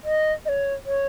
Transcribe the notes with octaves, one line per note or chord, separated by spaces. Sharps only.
D#5
D#5
C#5
C#5